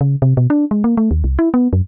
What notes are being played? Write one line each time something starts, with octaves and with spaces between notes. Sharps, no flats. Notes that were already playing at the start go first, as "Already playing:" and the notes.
C#3
C3
B2
D4
G#3
A#3
A3
D#2
C2
E4
B3
F#2